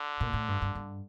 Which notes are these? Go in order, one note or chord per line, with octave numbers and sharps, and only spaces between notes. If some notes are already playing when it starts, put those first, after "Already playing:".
Already playing: D3
A#2
A2
G2
G2
G2